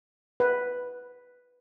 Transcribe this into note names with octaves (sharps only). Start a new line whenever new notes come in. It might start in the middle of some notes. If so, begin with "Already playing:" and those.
B4